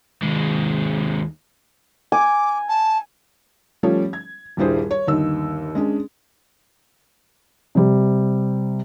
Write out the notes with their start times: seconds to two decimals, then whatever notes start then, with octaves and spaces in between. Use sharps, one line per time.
0.22 D#2 G#3
2.12 G#5 D6
2.68 A5
3.83 F3 G3 A3 C#4 C#5
4.13 G#6
4.57 D#1 G2 G3 E4 G#4 C5
4.91 C#5
5.07 G1 D#2 D#4 E6
5.75 G#3 C#4 D4
7.75 C3 G3